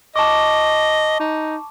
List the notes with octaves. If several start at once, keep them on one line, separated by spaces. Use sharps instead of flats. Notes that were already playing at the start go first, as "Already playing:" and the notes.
D#5 A5 C#6 D6
D#4